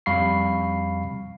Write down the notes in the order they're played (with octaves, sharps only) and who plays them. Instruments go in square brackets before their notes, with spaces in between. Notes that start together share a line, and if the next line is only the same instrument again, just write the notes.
[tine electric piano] F2 G3 F5 B5 C#6 C7